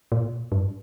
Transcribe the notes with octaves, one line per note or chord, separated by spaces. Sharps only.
A#2
G2